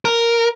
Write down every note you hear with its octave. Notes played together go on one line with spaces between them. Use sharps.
A#4